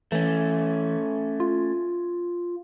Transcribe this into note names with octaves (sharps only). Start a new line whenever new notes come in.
E3 A3 C#4
F4